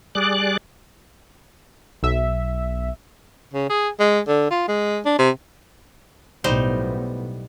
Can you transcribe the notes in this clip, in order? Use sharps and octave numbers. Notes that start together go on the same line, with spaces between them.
G3 G#4 D5 D6 F#6
B1 E5
C#3
G#4
G#3
D3
F4
G#3
D4
C3
B1 A2 G3 B3 D#4 C5